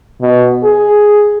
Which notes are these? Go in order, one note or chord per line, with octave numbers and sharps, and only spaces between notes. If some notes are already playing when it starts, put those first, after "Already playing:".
B2
G#4